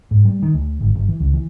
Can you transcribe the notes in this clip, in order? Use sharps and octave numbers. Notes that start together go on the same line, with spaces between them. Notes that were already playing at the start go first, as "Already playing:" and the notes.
G#2
G3
D#3
D2
G#1
G1
E3
C#2
E3